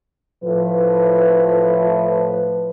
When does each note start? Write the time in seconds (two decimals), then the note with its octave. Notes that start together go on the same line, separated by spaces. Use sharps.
0.44 A2 F3 B4